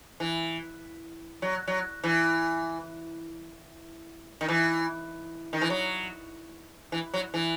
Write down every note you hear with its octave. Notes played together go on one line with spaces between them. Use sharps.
E3
F#3
F#3
E3
D#3
E3
D#3
E3
F#3
E3
F#3
E3